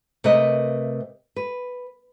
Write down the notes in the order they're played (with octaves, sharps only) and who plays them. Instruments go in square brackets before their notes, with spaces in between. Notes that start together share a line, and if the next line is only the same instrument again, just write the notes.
[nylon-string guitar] C3 A3 A#4 B4 D#5
B4